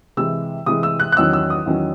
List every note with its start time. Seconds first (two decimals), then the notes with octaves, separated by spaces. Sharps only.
0.17 C3 E3 G#3 E6
0.66 C3 E3 G#3 D#6
0.83 E6
1.00 F#6
1.12 F#6
1.17 E2 D#3 F#3 C#4 E6
1.33 E6
1.50 D#6
1.66 E2 D#3 F#3 C#4